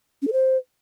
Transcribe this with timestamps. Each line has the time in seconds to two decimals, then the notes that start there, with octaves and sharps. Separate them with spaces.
0.22 C#4
0.27 A4
0.33 C5